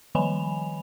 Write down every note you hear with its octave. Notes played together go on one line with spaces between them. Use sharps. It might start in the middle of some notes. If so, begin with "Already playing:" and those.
D#3 F3 G3 G#5 B5 F7